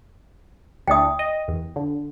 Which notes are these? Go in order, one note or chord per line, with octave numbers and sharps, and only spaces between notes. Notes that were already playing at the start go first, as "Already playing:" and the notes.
D2 D4 E4 G5 D#6
D#5
E2
D3